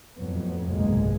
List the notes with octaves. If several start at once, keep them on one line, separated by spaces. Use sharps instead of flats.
F2 A2 F#3 B3
F1 B1 G2 D3 G#3 A#3